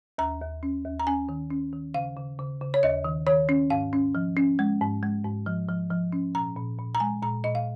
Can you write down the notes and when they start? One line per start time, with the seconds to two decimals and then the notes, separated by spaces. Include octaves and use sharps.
0.18 D#2 A#5
0.41 D#2
0.63 C#4
0.85 D#2
1.00 A#5
1.07 C#4 G#5
1.29 D#3
1.51 C#4
1.73 D#3
1.94 C#3 F5
2.17 C#3
2.39 C#3
2.61 C#3
2.74 C#5
2.83 D#2 D#5
3.04 D#3
3.27 D#3 C#5
3.49 C#4
3.70 G#2 F5
3.93 C#4
4.15 F3
4.37 C#4
4.59 G#3
4.81 G#2
5.03 G#3
5.25 G#2
5.46 F3
5.69 F3
5.91 F3
6.13 C#4
6.35 A#2 A#5
6.57 A#2
6.79 A#2
6.95 A#5
7.00 G#3 G#5
7.22 A#2 A#5
7.44 A#2 D#5
7.55 F5